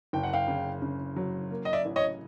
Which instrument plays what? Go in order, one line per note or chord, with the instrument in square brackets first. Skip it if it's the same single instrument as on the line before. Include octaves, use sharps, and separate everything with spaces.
[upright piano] F#1 [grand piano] G5
[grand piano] F#5
F5 G5
[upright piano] C#3
C#3
F#3
A#3
[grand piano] D#5
D5 E5
[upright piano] A1
[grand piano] C#5 D#5